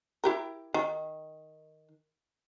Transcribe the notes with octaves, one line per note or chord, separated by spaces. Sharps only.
E4 G4 A#4
D#3